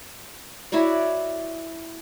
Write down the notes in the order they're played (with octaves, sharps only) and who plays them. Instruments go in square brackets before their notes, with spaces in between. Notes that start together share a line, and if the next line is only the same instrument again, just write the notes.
[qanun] E4 F#4 C#5 D5